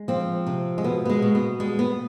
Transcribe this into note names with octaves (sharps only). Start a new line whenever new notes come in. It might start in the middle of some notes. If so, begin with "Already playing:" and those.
Already playing: G#3
F3 C4
C3
G#3
B2 B3
B3
G#3
B2
B3
G3 G#3
B3